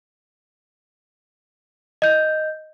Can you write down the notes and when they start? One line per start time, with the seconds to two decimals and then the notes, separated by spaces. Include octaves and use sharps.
2.02 D#5 G6